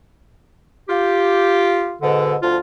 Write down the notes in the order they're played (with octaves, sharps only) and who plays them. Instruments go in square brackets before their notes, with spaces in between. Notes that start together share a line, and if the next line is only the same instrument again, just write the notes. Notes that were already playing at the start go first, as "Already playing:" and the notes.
[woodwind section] F4 G4
G#2 B2 D3
D2 F3 F4